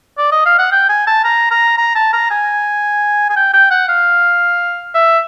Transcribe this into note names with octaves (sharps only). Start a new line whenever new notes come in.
D5
D#5
F5
F#5
G5
G#5
A5
A#5
A#5
A#5
A5
A#5
G#5
G#5
G5
G5
F#5
F5
E5